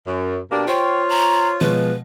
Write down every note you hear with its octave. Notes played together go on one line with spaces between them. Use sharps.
F#2
B2 A#3 D4 G4
F4 C5 C#5 G5
A#5
B2 F3 G#3 B4